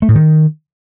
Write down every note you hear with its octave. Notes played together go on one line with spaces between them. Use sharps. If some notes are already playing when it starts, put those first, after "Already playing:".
A3
A2
D#3